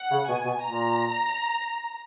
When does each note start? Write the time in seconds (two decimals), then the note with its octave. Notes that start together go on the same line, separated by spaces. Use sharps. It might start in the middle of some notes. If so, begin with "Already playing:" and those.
Already playing: F#5
0.11 C#3
0.28 B2 G#5
0.45 B2
0.62 A#2 A#5